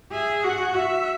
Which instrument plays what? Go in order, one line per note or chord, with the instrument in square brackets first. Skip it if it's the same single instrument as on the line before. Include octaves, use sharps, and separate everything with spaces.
[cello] G#4 [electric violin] E5
[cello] F#4 [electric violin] F#5
[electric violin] E5